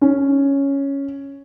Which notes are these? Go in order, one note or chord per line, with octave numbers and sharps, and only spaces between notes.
C#4